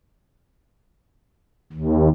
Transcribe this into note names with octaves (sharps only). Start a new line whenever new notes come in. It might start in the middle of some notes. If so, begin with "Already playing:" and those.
D#2